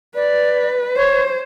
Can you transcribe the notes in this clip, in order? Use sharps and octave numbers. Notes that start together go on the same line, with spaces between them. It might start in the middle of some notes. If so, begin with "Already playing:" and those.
B4 D5
C5 C#5